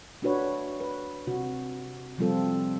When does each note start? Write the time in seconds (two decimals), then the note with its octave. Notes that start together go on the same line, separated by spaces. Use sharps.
0.22 A3 D4 F#4 B4 C#5
0.80 B4
1.27 C3 F#4
2.18 C3 F3 G3 C4 F4 A4